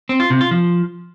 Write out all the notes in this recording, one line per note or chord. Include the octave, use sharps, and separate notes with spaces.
C4
F4
C3
F4
F3